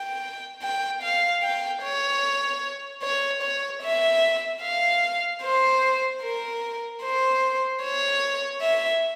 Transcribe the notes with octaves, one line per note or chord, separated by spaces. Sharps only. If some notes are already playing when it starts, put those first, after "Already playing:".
Already playing: G5
G5
F5
G5
C#5
C#5
C#5
E5
F5
C5
A#4
C5
C#5
E5